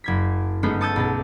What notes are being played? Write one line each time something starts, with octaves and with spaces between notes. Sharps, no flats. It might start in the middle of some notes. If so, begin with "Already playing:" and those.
F#1 G#6 B6
G1 G#3 A3 B3 C#4 D#4
A5 C#6 D#6 E6 G6 A6
B1 B2 A5